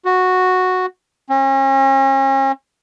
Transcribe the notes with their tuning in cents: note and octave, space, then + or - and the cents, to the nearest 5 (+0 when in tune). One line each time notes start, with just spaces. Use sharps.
F#4 -5
C#4 -40